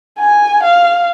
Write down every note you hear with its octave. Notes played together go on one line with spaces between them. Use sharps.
G#5
F5